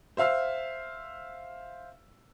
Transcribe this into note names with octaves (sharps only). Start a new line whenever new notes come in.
C5 E5 F5 E6 F6